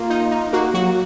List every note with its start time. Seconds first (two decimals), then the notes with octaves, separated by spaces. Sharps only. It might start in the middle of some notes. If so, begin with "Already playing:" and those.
Already playing: A#3 F4
0.10 D#4
0.31 D#4
0.53 A#3 F#4
0.74 F#3 F#4